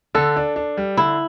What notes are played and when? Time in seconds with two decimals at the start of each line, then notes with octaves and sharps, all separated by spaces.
0.15 D3 A4
0.36 D4
0.56 D4
0.77 G3
0.97 D3 E4